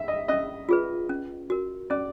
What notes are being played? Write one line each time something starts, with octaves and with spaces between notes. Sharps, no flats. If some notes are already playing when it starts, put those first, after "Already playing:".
Already playing: E5
D#5
C#4 D#5
F4 G#4 B4
C#4
F#4 A#4
C#4 D5